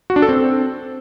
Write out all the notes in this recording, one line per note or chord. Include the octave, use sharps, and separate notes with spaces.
F#4
D4
A4
C4